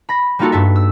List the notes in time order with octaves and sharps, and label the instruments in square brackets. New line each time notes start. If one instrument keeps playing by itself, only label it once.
[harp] B5 A#6
G3 A#3 D#4 F4 F#4 A4
G2 A4 E5
E6